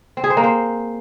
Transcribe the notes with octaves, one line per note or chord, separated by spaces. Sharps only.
C4
G#4
C5
A#3
C5